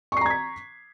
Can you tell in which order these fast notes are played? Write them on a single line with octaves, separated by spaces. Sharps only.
C#6 C7 A#5 G#6 B6